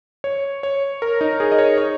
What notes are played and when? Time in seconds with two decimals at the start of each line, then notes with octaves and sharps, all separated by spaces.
0.24 C#5
0.63 C#5
1.02 A#4
1.21 D#4
1.40 G#4
1.52 D#5
1.58 C#5
1.78 C#5